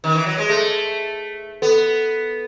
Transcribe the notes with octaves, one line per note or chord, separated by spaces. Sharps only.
D#3
E3
F#3
G#3
A3 G#4
B3 A4